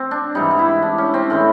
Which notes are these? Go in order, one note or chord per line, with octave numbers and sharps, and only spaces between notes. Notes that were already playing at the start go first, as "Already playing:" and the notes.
Already playing: C4
D4
G#2 E3 G3 D#4
D#4
E4
D4
C#4
C4
A2 E3 G#3 C#4